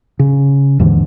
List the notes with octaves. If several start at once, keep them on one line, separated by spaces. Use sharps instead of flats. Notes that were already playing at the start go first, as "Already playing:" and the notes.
C#3
D#2 G#2 D3 E3